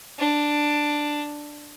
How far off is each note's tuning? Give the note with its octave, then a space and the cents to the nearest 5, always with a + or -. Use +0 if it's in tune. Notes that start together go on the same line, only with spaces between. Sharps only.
D4 +5